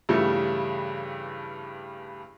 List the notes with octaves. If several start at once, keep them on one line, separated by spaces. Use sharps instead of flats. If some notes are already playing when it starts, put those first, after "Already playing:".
G2 C#3 E3 G3 A3